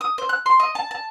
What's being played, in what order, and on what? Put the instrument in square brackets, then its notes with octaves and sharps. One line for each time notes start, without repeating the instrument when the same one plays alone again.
[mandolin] D#6
C5
F#6
C6
D#5
A5
A5